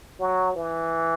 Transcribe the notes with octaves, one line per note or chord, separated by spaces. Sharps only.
F#3
E3